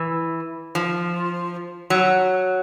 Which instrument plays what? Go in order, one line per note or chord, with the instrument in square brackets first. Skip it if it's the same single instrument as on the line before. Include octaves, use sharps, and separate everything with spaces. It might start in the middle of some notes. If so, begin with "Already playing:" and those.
Already playing: [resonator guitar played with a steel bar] E3
F3
F#3